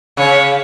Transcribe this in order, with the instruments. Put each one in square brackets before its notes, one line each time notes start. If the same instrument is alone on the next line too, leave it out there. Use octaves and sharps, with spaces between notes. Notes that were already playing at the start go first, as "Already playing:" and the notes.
[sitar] C#3 [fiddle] C#5